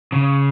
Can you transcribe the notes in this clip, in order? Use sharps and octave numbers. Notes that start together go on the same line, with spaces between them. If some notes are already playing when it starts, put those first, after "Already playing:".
C#3